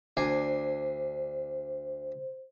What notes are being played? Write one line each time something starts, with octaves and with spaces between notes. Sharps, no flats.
D2 D4 C5 G#5